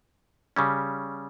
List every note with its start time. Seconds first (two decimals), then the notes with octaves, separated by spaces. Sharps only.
0.56 C#3 G3 C#4